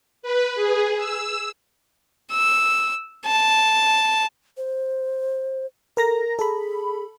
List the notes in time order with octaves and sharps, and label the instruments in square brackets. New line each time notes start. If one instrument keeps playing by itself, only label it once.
[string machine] B4
G#4
E6
[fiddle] E6
A5
[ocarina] C5
[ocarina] A4 [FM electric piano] A#4 A#5 A#6
[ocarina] G#4 [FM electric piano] A4 B5